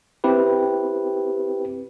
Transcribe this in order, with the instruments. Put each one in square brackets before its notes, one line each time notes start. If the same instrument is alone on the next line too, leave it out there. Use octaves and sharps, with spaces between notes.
[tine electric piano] C4 E4 G4 B4